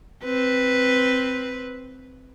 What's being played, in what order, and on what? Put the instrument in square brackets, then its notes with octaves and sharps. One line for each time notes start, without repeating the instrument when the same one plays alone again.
[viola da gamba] C4 B4